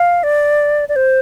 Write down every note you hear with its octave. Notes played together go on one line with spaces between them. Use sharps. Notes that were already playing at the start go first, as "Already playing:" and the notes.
Already playing: F5
D5
D5
C5